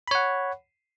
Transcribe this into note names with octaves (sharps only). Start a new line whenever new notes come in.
C#5 F#5 B5